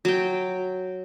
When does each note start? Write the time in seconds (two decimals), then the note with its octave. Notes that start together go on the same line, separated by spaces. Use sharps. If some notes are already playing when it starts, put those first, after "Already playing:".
0.05 F#3 G5